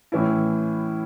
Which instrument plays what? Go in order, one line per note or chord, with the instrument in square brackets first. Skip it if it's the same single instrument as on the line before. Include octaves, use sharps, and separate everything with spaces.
[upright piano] A2 E3 C#4 E4